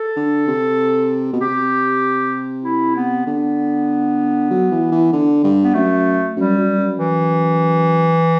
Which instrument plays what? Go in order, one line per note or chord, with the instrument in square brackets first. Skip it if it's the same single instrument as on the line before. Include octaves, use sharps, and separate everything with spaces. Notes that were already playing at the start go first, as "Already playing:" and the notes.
Already playing: [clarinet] A4
[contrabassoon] D3
C3
B2
[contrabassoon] C3 [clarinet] G4
[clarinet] E4
B3
[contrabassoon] D3 [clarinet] B3
[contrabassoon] F#3
E3
E3
D3
G2
[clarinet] B3
[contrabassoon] F#2 [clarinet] A3
[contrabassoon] F#2 [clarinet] G3
[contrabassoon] F#2
F#2
[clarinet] E3